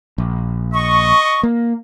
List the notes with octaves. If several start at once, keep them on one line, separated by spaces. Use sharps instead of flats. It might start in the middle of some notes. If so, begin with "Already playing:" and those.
A#1
D#5 C#6
A#3